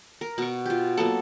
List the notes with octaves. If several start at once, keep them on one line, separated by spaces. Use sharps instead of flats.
A#4
B2 C#6
F4 G4
F#3 A#3 B3 A4